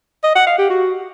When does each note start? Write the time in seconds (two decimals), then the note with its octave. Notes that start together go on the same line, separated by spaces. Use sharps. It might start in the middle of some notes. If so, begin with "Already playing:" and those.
0.24 D#5
0.35 F#5
0.47 F5
0.58 G4
0.70 F#4